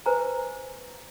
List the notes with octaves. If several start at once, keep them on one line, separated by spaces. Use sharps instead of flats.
B4 C5 G#5 A#5